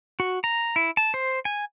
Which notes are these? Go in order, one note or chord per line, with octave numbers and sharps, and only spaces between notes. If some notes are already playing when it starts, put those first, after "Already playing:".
F#4
A#5
E4
A5
C5
G#5